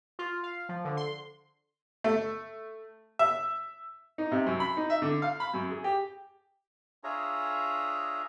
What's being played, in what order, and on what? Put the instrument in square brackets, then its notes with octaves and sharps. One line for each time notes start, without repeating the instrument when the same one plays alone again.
[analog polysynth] F4
F5
F3
D3
C6
[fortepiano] A3
E5
D#4
C3
F#2
B5
D#4
E5
D3
F5
B5
F#2
G#4
G4
[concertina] D4 F4 G#4 C#5 E5 A#5